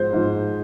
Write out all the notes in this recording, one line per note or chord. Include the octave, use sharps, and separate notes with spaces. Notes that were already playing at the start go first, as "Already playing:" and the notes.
Already playing: G#2 F3 C5
G#2 F3